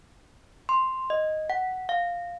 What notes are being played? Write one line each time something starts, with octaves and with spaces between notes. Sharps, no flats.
C6
D#5
F#5
F5